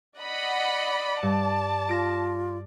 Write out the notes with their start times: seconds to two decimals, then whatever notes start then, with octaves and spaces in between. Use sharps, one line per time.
0.19 D5 D#5 F#5 B5
1.23 G2 A5
1.89 F4 A#6 D7